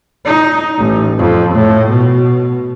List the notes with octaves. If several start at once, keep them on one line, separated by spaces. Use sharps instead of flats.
D#4
A1
F2
A2
B2